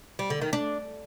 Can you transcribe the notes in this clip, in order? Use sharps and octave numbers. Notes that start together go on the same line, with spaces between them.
G3
D3
D#3
D4